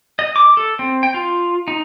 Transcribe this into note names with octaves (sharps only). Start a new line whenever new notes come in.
D#5
D6
A4
C4
G5
F4
D#4